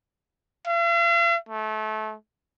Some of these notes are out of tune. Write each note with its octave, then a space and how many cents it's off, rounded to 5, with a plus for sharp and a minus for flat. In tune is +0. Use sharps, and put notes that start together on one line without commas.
F5 -45
A3 -25